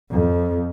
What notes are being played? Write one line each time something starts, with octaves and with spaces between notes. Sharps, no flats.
F2